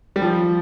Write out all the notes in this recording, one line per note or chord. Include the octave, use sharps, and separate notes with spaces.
G3
F3